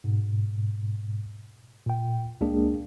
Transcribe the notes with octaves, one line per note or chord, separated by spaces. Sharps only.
G#2 B2
A#2 G5
C#2 G#3 A#3 D4 G#4